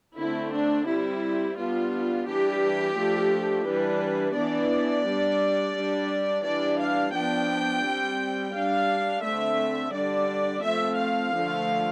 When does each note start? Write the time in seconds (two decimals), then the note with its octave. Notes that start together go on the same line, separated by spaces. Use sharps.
0.17 D3 A3 C4 E4
0.53 D4
0.87 G3 C4 E4
1.57 G3 B3 D4 F4
2.27 E3 G3 D4 G4
2.97 F3 A3 D4
3.66 E3 G3 D4 B4
4.36 E3 B3 D4 D5
5.05 G3
5.10 D4
5.75 G3 D4
6.45 E3 G3 D4 D5
6.80 F5
7.15 F3 B3 D4 G5
7.85 G3 C4
8.55 G3 D4 F5
9.24 D3 A3 C4 E5
9.94 D3 G3 D4 D5
10.64 F3 A3 C4 E5
10.99 F5
11.34 D3 F3 A3